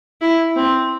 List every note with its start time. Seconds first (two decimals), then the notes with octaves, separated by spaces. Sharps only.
0.21 E4
0.56 C4